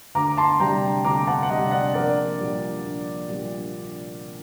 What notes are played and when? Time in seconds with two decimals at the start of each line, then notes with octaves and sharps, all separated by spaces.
0.15 D2 A#5 D6
0.37 A5 C6
0.60 C3 G3 G5 A#5
1.04 D2 A#5 D6
1.27 F#5 A5
1.43 F#5
1.49 C3 G3 D#5 G5
1.71 D5 F#5
1.94 A#1 A#4 D5
2.39 A#2 G3
2.84 A#1
3.29 A#2 G3